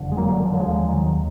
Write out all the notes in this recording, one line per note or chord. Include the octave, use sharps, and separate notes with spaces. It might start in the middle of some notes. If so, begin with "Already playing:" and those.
Already playing: F#1 F2 D3
G#3
F#3 A#3
D3
D#3
F3
F#3
F1 D#2 D3 F3 G#3
D#3 F#3